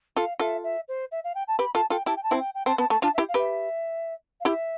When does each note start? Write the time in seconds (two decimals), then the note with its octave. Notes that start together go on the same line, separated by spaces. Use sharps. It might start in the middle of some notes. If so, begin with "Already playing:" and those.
0.16 F4 A4 F5
0.39 F4 A4 E5
0.64 E5
0.88 C5
1.12 E5
1.24 F5
1.35 G5
1.48 A5
1.59 G4 B4 B5
1.75 F4 A4 A5
1.90 F4 A4 G5
2.06 E4 G4 A5
2.16 G5
2.23 A5
2.31 C4 E4
2.39 G5
2.55 G5
2.66 C4 A5
2.78 B3 A5
2.90 A3 A5
3.02 D4 F4 A5
3.14 E5
3.18 E4 G4
3.29 F5
3.34 G4 B4 E5
4.40 F5
4.45 E4 G4 E5